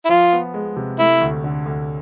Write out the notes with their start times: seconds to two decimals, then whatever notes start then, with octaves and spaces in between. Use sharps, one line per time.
0.05 E4
0.09 F3 F4
0.33 B3
0.54 G#3
0.77 C3
0.98 A3 E4
1.21 D2
1.44 D3
1.66 D2